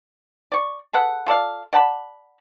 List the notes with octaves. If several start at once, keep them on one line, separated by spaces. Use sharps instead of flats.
D5 C#6
G#4 A4 B4 F#5
F4 A4 D5 F5
D5 F#5 A5 B5